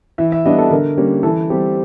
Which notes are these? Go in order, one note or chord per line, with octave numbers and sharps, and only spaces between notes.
E3 E5
E5
G3 B3 D4 D#5
A4
D3 A#4
G3 A#3 C#4
E3 A4
G3 C4 G4